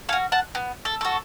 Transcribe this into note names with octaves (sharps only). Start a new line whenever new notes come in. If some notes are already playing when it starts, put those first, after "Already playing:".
A4 F5 G#5
F#4
F#5 A5
B3
A4
F#4 A4